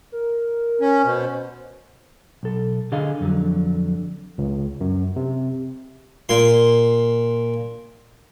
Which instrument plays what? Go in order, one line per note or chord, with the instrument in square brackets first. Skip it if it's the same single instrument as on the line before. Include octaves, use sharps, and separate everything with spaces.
[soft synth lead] A#4
[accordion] C#4
[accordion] B2 [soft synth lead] C5
[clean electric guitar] B1 A4
D3 G#4 D#5 F5
F2 D3 F#3
[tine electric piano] C#2
F#2
C3
[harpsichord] A#2 C6